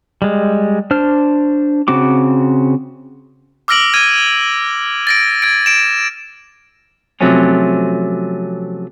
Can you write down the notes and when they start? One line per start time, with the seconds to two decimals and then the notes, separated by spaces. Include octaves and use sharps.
0.22 G3 G#3
0.91 D4 C5 F6
1.88 C#3 C4 F#4 D6
3.68 D6 E6 F6 A#6 D7 F#7
3.94 F6 G#6 D#7
5.07 A6 A#6 D7
5.42 G#6 D7
5.66 D7 E7
7.21 C3 F3 F#3 A3 C4 C#4